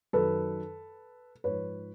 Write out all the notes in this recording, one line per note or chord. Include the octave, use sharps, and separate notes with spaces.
F#2 D#3 F#3 A4 B4
G#2 F3 B4 C#5